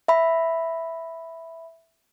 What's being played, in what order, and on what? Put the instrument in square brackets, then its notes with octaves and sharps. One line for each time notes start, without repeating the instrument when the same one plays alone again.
[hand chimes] E5 B5